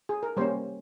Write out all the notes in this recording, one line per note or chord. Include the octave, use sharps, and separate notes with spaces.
G#4
A#4
G3 A#3 C#4 C5